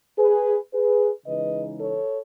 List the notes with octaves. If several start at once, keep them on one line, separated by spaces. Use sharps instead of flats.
G#4 B4
G#4 B4
C#3 E3 G#3 D#4 B4 D#5
A4 C#5